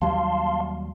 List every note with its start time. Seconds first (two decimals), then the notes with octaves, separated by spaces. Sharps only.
0.02 D#2 F#3 G3 F5 A5 C6